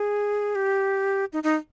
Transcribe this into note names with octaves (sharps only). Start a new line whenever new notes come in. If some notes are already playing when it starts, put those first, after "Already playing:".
Already playing: G#4
G4
D#4
D#4